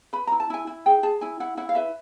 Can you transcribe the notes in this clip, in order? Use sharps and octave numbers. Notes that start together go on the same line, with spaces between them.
B4 B5
E4 A#5
A5
E4 G#5
E4
G#4 G5
G#4 A5
E4 G#5
E4 F#5
E4 F#5
F5
B4 E5